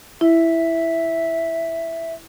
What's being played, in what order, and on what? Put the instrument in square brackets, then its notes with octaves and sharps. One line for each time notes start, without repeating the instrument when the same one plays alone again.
[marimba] E4 [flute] E5